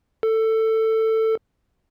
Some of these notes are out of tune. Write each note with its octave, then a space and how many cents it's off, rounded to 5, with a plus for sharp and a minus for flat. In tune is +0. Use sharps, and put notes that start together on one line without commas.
A4 +15